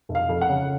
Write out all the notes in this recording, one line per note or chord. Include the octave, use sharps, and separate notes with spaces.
F1
F5
F2
F#5
C#3